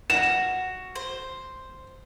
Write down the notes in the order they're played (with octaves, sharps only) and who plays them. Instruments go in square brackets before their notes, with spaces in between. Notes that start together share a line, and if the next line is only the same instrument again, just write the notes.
[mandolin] F#4 [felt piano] E7
[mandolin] C5